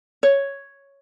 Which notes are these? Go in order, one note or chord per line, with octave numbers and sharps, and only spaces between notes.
C#5